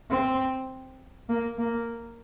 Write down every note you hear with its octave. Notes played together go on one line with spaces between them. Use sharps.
C4
A#3
A#3